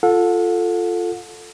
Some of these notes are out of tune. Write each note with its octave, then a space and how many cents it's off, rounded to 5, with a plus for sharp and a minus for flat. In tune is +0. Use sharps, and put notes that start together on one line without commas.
F4 +0 A4 +0 F#5 -45